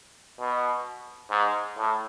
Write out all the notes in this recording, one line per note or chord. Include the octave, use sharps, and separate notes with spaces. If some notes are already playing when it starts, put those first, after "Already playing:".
B2
G#2
A2